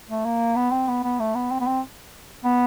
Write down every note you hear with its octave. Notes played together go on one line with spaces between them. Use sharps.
A3
A#3
B3
C4
B3
B3
A3
B3
C4
B3
C4
B3